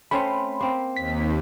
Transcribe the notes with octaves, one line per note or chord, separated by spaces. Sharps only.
A3 C4 C#4 B5 C6
A#3 C4
D#2 B6